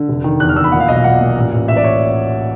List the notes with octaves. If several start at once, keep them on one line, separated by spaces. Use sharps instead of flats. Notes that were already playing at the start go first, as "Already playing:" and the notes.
Already playing: D3
F1
D#3
E2 F#6
F6
E2 E6
B5
A#2 F#5
F5
B1 D#5
F5
A#2 F#5
A#2
A1
A1
A1 E5
D5
C#5